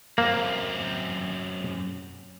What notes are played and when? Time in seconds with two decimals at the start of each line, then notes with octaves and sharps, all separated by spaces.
0.18 F#2 A#3 C4